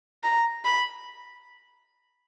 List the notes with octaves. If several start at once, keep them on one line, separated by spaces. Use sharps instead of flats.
A#5
B5